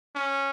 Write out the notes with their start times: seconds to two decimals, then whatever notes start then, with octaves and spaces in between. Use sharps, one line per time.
0.16 C#4